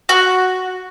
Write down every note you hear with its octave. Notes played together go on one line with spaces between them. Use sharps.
F#4